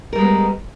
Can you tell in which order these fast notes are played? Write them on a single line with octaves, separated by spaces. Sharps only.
A#4 G3 G#3 B3